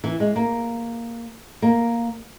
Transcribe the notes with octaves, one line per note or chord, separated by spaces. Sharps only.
E3
G#3
A#3
A#3